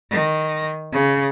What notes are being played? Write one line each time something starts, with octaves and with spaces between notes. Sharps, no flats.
D#3
C#3